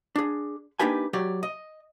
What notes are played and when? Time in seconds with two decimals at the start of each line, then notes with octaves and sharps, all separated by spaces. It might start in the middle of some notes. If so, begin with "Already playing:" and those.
0.16 D4 G#4
0.79 A#3 D4 D#4 G4 B4 G#5
1.13 F#3 G4 C#5 D5
1.43 D#5